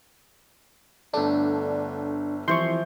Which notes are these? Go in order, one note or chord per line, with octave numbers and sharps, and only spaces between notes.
G1 D3 A3 D4
C2 E3 F3 C6 C#6 G6